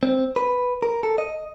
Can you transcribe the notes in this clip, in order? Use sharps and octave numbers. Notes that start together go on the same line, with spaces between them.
C4
B4
A#4
A4
D#5